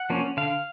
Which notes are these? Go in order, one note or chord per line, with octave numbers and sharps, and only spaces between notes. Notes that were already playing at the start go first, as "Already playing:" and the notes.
Already playing: F#5
F3 A#3 C#4
D3 F5